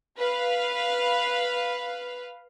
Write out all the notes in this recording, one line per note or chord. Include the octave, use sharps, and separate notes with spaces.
B4 F5